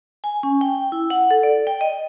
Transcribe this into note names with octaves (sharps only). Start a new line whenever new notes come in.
G#5
C#4
G5
E4
F#5
A4
D5
G5
D#5